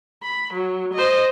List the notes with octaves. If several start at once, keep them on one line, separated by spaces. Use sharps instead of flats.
B5
F#3
C5 D#5